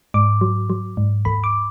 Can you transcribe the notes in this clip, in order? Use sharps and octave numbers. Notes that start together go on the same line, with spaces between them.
G#2 D6
F#3
F#3
G#2
D#2 B5
D6